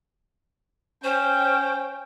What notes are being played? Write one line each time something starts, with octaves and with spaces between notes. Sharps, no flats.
C#4 C5 G5